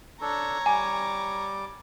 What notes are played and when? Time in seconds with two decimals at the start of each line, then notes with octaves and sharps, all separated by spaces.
0.21 D4 A4 C#5 A#5
0.66 G3 G#5 D6